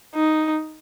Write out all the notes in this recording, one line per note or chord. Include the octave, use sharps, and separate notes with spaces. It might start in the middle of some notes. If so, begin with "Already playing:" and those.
D#4